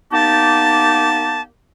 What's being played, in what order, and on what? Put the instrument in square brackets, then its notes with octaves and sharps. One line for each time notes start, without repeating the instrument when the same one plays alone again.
[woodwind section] A#3 B3 D#4 G4 D5 A5